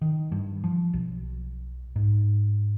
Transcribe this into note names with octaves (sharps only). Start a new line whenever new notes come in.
D#3
G2
F3
B1
G#2